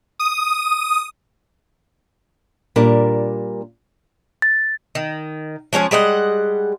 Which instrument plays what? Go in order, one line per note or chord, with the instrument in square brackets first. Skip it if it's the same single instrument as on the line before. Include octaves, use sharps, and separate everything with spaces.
[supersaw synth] D#6
[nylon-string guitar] A#2 G3 D4 A#4
[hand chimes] A6
[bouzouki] D#3
F3 G#3 C#4 C#5
G3 G#3 D#5 F#5